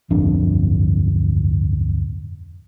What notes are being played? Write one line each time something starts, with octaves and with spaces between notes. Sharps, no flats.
D1 G1 F2 D4